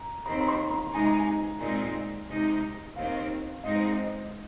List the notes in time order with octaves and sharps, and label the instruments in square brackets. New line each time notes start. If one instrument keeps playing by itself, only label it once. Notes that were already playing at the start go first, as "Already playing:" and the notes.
Already playing: [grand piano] A#5
[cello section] D#2 D#3 C4 [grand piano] A#5
[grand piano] A#5
C6
A#5
[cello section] C3 G#3 D#4 [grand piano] G#5
[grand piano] A#5
G#5
[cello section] A#2 G#3 C4 D#4
C3 G#3 D#4
[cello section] D#2 D#3 C4 [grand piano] F5
[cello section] G#2 G#3 C4 D#4 [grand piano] D#5
[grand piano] C5
D#5